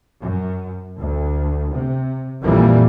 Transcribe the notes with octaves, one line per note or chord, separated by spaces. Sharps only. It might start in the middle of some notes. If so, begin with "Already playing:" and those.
F#2
D2
C3
A#1 F2 A#2 E3 G3 A#3